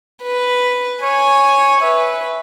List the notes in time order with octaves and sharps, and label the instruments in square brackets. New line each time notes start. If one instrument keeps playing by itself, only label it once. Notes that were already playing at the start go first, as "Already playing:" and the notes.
[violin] B4
[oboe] C#5 [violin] G#5
[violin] B4 [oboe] E5